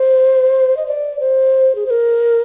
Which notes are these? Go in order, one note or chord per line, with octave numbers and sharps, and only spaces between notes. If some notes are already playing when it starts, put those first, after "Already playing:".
Already playing: C5
D#5
D5
C5
G#4
C5
A#4